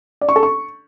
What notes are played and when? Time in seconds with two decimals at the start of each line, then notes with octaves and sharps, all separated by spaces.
0.21 D5
0.29 C#6
0.36 A4
0.43 C#6